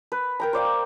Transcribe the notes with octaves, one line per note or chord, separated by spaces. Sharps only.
B4
A#4 G5 A#5
C5 D5 F5 G5